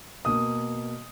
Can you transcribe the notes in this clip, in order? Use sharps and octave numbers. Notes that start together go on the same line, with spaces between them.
B2 A#3 D#6